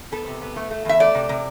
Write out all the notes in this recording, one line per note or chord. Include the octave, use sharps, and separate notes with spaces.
B3 A4
C3
B3
A3
A3
E2 E5
A3 D5
C3
C3